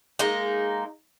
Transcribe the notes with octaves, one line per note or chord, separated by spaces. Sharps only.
G#3 A#3 D#4